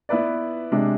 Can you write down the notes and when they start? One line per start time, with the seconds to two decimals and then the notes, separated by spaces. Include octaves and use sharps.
0.09 B3 E4 B4 D5
0.72 C3 G#3 D4